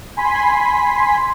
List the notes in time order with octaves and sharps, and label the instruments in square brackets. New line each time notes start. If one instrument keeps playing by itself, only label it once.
[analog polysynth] G#5 B5 C6 B6